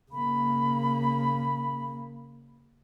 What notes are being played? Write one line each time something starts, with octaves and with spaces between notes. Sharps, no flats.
C#3 A#3 B5